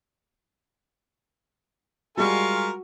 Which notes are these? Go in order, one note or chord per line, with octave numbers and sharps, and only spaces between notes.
G3 G#3 F4 F#4 A#4 G#5 C#6